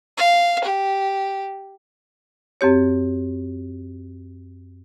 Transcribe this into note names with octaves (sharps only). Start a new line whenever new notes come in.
F5
G4
F#2 C4 G4 C#5